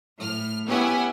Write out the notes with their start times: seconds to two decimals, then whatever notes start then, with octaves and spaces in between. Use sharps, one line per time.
0.17 A2 F6
0.66 B3 C#4 E4 G4 F#5 G#5